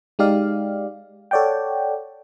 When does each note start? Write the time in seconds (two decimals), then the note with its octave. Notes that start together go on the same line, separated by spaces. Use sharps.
0.19 G#3 D#4 G4 D5 F5
1.31 A4 C#5 D5 F#5 G5